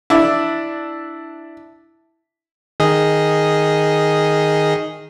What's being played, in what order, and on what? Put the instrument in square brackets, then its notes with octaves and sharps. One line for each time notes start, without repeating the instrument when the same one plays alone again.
[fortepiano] D4 E4
[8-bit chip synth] D#3 G#4 D#5